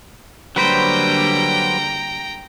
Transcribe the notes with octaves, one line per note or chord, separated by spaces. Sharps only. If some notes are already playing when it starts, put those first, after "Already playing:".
D3 F#3 G3 A#3 B4 C5 G5 A#5